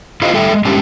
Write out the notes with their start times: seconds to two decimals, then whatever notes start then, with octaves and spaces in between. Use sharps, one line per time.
0.22 E4 F4 G#4 C5 D#5 F5
0.33 G3 A3 A4 E5 G5
0.53 G#3
0.65 G3 G#3 C#4 D4 E4 G4